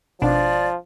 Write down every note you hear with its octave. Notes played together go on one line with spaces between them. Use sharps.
G#1 B2 F3 D4 D5